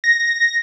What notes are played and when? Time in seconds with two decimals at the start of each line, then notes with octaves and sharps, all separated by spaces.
0.04 A#6